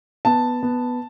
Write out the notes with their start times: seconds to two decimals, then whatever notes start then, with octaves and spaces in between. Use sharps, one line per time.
0.25 B3 A5
0.63 B3